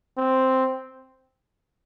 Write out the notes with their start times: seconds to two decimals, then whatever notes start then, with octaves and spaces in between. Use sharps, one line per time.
0.18 C4